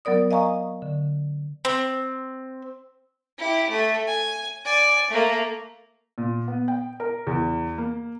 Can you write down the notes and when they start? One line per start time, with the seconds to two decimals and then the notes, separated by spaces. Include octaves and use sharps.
0.05 F#3 B3 A#4 D5 D#6
0.31 D#5 F5 G#5 A#5 C#6 D#6
0.82 D3
1.65 C4
3.38 E4 G4
3.70 A3
4.08 G#5
4.65 D5 G#5
5.10 A3 A#3
6.18 A#2
6.48 B3
6.68 G5
7.00 A#4
7.27 E2
7.78 A#3